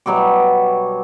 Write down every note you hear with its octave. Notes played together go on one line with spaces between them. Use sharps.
B2 F#3 G3 D6